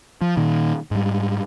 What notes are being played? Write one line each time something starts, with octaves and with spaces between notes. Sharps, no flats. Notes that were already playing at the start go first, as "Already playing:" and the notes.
F3
A#2 D#3
G#2 G3